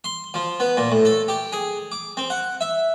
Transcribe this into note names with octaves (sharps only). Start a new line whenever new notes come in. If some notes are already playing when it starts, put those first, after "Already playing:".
C6
F3
B3
A#2
A2
A4
G4
G#4
D6
C4
F#5
E5